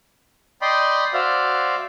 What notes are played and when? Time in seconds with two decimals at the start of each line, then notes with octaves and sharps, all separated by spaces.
0.62 D5 D#5 G5 B5 C6
1.14 F#4 C5 D5 E5 F5